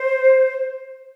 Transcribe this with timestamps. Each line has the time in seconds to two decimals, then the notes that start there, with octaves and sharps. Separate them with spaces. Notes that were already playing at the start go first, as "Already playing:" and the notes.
Already playing: C5